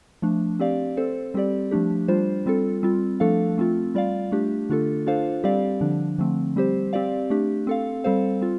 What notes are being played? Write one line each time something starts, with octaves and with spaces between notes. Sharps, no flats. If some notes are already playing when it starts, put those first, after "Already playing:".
F3 A3 D4
C4 G4 D5 F5
C4 A4 C5
G3 C4 G4 D5
F3 A3 D4 G4
G3 D4 F4 C5
G3 C4 F4 A4
G3 C4 F4
F3 A3 D4 A4 F5
A3 C4 F4
G3 F4 D5 F5
A3 D4 G4
D3 A3 D4 F4 A4
D4 F4 A4 C5 F5
G3 C4 G4 D5 F5
D3 F3 D4
D3 F3 A3 C4
G3 C4 G4 C5
C4 G4 D5 F5
A3 D4 G4
C4 A4 F5
G3 C4 A4 C5 F5
C4 F4